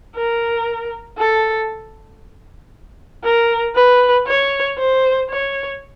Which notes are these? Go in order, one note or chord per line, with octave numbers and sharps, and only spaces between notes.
A#4
A4
A#4
B4
C#5
C5
C#5